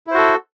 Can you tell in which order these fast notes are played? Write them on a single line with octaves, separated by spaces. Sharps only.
E4 C5 F#4 A4